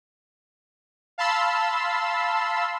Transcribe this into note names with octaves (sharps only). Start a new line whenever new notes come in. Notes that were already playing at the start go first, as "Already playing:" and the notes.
F5 A5 B5 C6 E6